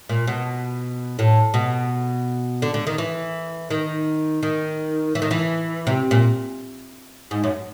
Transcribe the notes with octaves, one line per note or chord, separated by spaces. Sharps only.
A#2
B2
A2
B2
D3
D3
D#3
E3
D#3
D#3
E3
D#3
E3
C3
A#2
G#2
F#2